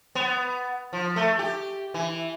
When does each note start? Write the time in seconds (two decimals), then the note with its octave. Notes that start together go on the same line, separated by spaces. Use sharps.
0.15 B3
0.93 F3
1.16 A3
1.39 G4
1.94 E3